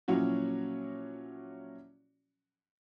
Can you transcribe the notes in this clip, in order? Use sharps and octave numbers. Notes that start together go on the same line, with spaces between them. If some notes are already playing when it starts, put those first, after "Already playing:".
A#2 F3 F#3 C#4 E4 F#4